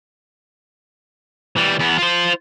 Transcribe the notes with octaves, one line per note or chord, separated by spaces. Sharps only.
E3 G3
E2 B3
F4 C5